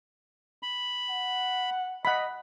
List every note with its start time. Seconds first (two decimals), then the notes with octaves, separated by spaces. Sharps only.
0.63 B5
1.10 F#5
2.05 D#5 F#5 B5